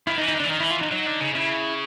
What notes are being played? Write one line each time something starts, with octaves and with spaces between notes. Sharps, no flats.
D#3 E4
D#4
E3
D#4
D3
D4
E3
D#3 D#4
E3 E4
F4
D#4
F#3 D#4
D3
C#3
C#3 E4